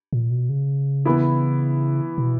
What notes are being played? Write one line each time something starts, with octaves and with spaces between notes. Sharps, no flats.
A#2
B2
C#3
E3 B3 E4
B2